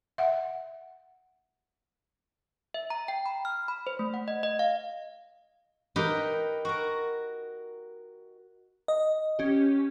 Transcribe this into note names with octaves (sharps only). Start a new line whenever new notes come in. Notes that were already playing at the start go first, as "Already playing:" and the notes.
E5 F#5
E5
A#5
G5
B5
F6
B5
C5
A3
F#5
D#5
D#5
F5
D#4 G4 A#4 B4
F#4 A#4
D#5
C#4 G4